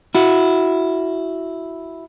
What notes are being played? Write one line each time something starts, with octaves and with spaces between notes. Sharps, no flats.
E4 F#4